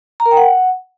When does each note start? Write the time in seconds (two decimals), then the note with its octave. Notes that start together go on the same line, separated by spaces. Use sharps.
0.20 A#5
0.26 A#4
0.31 G5
0.37 F#5